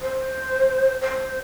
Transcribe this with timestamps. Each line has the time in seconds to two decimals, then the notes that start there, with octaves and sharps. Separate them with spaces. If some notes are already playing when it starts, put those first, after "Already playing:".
0.02 C5
1.02 C5